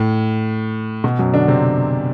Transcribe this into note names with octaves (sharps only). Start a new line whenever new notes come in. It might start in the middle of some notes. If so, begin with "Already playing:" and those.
Already playing: A2
B2
F#2 F#3
D3 D4
C3 C4